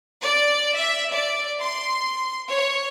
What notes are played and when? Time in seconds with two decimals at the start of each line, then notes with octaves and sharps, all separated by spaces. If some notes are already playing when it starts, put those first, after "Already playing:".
0.24 D5
0.76 E5
1.12 D5
1.60 C6
2.52 C#5